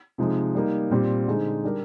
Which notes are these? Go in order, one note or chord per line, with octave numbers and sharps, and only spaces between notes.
C3 F3 G#3 D#4
G3 A#3 D#4
A#2 G3 C4 G4
D3 G#3 D#4 G#4 C5
G3 D4 G4 A#4